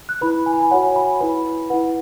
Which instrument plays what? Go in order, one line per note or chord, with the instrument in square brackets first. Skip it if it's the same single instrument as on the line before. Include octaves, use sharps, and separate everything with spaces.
[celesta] F#6
E4 B4 B5
G#5
B5
G#5
F#4 C#5 F#5
G#5
B5
G#5
E4 B4 B5
E4 B4 F#5